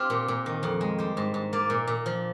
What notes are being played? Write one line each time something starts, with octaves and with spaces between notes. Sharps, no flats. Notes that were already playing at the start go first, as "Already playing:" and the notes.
Already playing: C4 F4 G4
A#2
A#2
D#3
F2
G#3
G3 C5
G#2
G#2
A#3 D5
A#2
A#2
F3